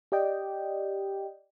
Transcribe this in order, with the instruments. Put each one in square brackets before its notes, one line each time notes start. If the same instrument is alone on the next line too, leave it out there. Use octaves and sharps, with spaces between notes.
[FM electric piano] G4 D5 D#5 G5